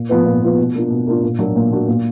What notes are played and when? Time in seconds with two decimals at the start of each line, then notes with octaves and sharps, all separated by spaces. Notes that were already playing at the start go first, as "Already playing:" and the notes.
Already playing: A#2
0.09 F3 B3 F4 B4
0.26 A#2
0.42 F3 B3 F4 B4
0.58 B2
0.74 A#3 D4 F4
0.90 B2
1.07 A#3 D4 F4
1.23 A#2
1.39 F#3 A#3 D4 F#4
1.56 A#2
1.71 F#3 A#3 D4 F#4
1.88 A#2